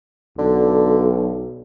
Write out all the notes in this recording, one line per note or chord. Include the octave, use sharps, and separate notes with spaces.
B1 D3